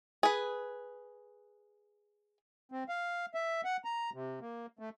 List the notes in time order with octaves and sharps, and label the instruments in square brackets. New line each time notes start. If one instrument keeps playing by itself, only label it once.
[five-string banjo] G#4 B4
[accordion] C4
F5
E5
F#5
A#5
C3
A#3
A3